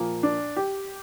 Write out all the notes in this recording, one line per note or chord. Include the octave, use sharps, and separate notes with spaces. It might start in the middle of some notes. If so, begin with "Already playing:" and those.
Already playing: A#2 F3 A#3
D4
G4